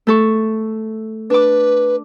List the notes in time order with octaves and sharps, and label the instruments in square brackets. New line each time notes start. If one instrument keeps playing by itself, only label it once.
[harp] A3 A4 C#6
[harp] D4 D6 [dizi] B4